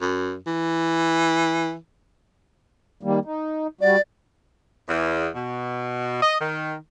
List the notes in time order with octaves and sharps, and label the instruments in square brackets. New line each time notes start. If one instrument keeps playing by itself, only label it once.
[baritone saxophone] F#2
E3
[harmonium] D#3 G3 A#3
D#4
[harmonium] G3 F#4 [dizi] D5
[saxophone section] E2
B2
D#5
D#3